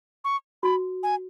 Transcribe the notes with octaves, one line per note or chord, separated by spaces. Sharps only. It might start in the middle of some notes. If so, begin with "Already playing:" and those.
C#6
F#4 B5
G#5